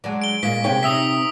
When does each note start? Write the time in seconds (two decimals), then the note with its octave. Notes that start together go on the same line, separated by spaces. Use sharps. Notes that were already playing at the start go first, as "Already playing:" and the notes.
0.04 F#3 G#3 D4
0.22 D7 G7
0.43 A#2 G#3 A#3 B6
0.64 C3 G#3 C#5 G5
0.83 D#4 E5 D#6 E6 B6